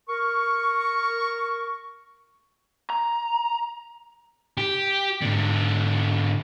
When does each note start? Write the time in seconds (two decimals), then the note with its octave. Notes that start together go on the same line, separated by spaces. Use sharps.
0.08 A#4 C#6
2.90 A#5
4.58 G4
5.22 G#2 D3